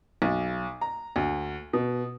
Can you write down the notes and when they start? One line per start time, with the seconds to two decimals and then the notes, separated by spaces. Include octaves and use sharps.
0.22 B1
0.81 A#5
1.16 D2
1.73 B2